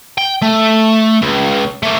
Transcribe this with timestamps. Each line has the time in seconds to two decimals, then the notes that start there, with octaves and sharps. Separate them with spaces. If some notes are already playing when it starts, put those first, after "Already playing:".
0.18 G5
0.42 A3
1.22 C#2
1.83 A3 A#3